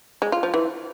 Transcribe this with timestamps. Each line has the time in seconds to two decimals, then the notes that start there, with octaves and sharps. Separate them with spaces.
0.22 G#3
0.32 F4
0.43 F3
0.54 E3